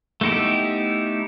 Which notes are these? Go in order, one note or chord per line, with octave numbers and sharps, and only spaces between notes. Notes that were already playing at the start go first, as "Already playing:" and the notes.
A3 B3 D#4 E4 G4